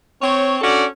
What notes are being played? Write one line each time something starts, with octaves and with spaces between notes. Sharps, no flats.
C4 C#5
C#4 D4 F#4 A4 D5